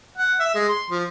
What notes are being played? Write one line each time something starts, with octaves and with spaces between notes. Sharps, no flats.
F#5
E5
G#3
C6
F3